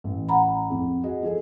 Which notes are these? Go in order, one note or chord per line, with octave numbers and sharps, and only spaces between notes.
A1
F#5 A#5 B5
F2
F#4 G#4 D#5
F3 G#4 A4